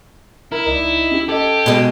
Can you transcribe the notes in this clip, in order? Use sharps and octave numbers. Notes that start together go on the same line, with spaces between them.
E4 A#4
C#2 D#4 D5
C#4 G4
G4 A4 D#5 G#6
B2 G#3